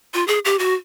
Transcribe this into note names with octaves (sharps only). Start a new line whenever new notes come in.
F4
G#4
G4
F#4